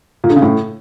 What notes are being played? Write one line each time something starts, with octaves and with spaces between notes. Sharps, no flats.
A#2
D3
C#3
A2